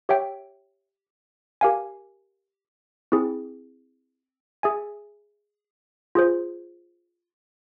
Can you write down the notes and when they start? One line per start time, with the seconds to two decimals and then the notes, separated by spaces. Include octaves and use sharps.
0.09 G4 C#5 E5 G5
1.61 G4 A#4 F5 G#5
3.12 C4 E4 G#4
4.63 G#4 E5 G#5
6.15 F4 G#4 C5